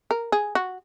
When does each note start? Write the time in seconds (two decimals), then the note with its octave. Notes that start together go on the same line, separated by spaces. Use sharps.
0.11 A#4
0.32 G#4
0.55 F#4